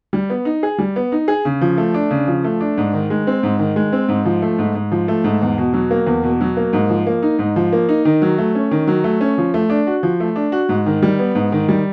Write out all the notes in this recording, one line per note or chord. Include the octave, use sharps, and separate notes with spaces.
G3
B3
D#4
G#4
G3
B3
D#4
G#4
C#3
F3
A3
D4
C#3
F3
A3
D4
G#2
D#3
G#3
C4
G#2
D#3
G#3
C4
G#2
F3
A3
G#2
G#2
F3
A3
G#2
E2
B2
F#3
A#3
E2
B2
F#3
A#3
G#2
F3
A#3
D#4
G#2
F3
A#3
D#4
D#3
F#3
A3
C#4
D#3
F#3
A3
C#4
F3
A3
D4
F#4
F3
A3
D4
F#4
G#2
D#3
G3
B3
G#2
D#3
G3